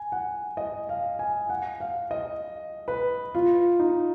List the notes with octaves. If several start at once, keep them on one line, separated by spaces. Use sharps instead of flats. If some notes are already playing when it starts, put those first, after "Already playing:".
Already playing: G#5
F#5
D#5
F5
G#5
F#5
F5
D#5
B4
F4
D#4